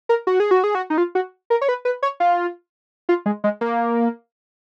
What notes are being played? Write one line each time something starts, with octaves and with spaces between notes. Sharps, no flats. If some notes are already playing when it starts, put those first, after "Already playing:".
A#4
F#4
G#4
F#4
G#4
F#4
D#4
F4
F#4
A#4
C#5
B4
B4
C#5
F4
F4
G#3
G#3
A#3